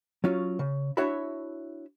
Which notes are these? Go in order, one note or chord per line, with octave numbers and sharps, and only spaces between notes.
F#3 C#4 F4
C#3
D4 E4 F#4 C#5 E5 B5